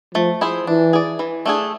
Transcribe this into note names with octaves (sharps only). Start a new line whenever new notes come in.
F3 A3
E4 G#4 C5
E3 D4
G#4 D5
E3
A3 D4 G#4